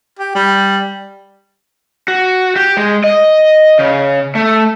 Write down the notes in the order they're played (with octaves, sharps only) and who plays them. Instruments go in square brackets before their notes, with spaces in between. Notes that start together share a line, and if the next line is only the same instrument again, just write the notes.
[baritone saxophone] G4
G3
[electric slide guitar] F#4
G4
G#3
D#5
C#3
A3